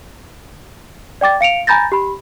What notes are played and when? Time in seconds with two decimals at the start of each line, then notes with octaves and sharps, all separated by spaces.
1.21 D5 G5 D6 A6
1.41 F5 C#7 D7 F7
1.67 G#5 A#5 B5 G6 A6 A#6
1.92 G4 B5